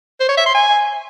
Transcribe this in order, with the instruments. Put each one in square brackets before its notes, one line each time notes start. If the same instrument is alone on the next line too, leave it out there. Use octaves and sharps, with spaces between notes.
[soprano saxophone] C5
C#5
E5
C6
G#5